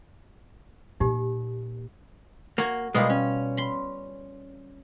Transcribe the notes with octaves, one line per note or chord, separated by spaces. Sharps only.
A#2 D#4 G4
A#3 F#4 C#5
B2 G3 G#3 A#3 F4
C#4
B5 C6